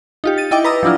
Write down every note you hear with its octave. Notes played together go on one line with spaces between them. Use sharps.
D#4 F4 G4
A6 D#7
E4 D#5 G5 D6
B4 A#5 D#6 E6
F3 F#3 D4 E4 F4